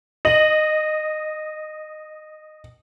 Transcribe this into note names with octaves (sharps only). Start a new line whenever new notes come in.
D#5 F#7